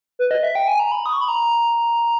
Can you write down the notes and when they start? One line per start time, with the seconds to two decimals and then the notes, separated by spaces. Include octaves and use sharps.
0.19 B4
0.31 D#5
0.43 E5
0.55 G5
0.68 G#5
0.79 A#5
0.92 B5
1.06 D#6
1.13 C#6
1.21 B5
1.28 A#5